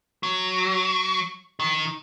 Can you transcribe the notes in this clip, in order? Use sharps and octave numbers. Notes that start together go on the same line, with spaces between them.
F#3
D#3